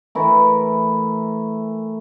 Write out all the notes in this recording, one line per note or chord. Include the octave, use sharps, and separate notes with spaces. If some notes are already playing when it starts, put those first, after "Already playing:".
E3 A3 E4 A#4